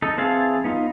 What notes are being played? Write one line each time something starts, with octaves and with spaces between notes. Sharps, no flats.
D#4 A4
E3 C4 G#4 F5 A5
B3 D#4 F4